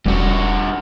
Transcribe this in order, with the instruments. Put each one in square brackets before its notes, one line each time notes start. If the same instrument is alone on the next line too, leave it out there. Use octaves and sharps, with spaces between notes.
[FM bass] E1 [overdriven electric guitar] G2 F#4